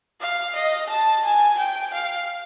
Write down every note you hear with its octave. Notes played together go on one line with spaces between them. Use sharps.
F5
D#5
A5
G#5
G5
F5